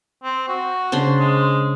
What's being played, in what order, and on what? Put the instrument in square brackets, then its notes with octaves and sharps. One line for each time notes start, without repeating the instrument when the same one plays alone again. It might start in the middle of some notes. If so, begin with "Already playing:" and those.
[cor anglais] C4
F#4
[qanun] C#3 D4 C5
[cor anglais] G#3